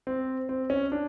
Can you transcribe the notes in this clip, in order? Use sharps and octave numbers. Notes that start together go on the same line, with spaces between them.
C4
C4
C#4
D4